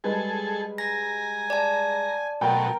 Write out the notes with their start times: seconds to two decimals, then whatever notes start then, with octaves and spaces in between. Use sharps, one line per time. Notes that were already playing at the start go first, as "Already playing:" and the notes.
0.04 G3 G#3 G#4 A4 B4
0.78 G#5 A#5 A#6
1.50 D5 A5
2.41 B2 F#3 A3 A#4 G5